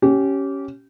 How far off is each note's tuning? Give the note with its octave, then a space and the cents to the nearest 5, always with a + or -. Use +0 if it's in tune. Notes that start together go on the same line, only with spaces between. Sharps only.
C#4 +0 G4 -25